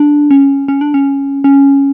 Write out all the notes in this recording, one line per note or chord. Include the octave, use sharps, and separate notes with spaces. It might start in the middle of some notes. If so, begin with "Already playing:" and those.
Already playing: D4
C#4
C#4
D4
C#4
C#4